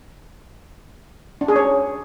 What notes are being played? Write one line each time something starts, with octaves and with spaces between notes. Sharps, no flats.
D4
G#4
C#5